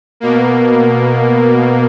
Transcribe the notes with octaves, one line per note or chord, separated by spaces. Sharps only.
B2 A#3